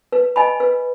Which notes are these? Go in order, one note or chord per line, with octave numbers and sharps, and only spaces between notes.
B4
D#5 G#5 B5
B4